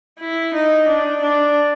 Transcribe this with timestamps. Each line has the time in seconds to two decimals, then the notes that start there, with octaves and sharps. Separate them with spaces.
0.20 E4
0.54 D#4
0.88 D4
1.21 D4